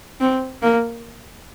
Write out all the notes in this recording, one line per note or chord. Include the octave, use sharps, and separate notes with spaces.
C4
A#3